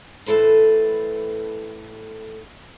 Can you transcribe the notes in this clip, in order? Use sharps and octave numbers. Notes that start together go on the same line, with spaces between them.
A2 E3 A4 B4 C5